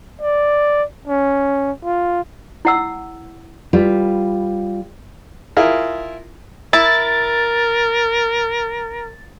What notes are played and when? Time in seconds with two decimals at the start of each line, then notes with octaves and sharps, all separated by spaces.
0.21 D5
1.08 C#4
1.85 F4
2.65 E4 F#5 E6
3.73 G3 F4 B4
5.57 E4 F4 G#4 A#4
6.73 E4 A#4 A6